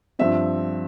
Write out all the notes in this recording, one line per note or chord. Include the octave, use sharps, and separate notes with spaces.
G2 F3 C4 E5